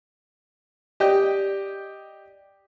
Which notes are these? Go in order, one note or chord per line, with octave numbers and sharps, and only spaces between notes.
G4 D5 D#5 G5